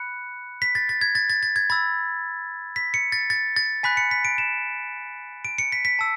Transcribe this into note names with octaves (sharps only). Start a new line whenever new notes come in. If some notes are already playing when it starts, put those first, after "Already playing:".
Already playing: B5 F#6 C#7
B6
A6
A6
G#6
A6
A6
A6
G#6
B5 E6 A6
B6
C#7
A6
A6
A6
G#5 B5 F#6 B6
C#7
B6
D7
E7
D7
C#7
B6
B6
A5 E6